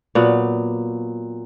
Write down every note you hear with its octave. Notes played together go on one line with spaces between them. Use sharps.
A#2 F#3 B3 F#5